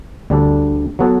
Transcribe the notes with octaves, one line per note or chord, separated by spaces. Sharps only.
D2 D3 G3 D4 A4
F#3 B3 F#4 A4 C#5